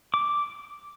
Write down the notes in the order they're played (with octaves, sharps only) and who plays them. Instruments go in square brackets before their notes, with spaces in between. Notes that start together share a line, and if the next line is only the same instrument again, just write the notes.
[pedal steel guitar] D6